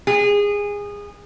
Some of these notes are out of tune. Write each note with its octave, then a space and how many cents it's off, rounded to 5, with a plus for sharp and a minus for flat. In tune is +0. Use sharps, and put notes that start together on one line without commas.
G#4 -20